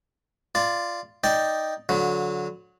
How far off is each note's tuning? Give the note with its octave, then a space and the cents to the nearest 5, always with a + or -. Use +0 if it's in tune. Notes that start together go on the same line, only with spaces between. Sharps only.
F4 -10 D5 +5
D#4 +0 D5 +0 G5 +0
D3 -25 F#3 -25